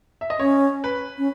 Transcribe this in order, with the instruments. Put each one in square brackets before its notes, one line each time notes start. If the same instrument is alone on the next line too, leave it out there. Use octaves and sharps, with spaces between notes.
[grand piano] E5
D#5
[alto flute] C#4 [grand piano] C#5
[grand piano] B4
[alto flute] C#4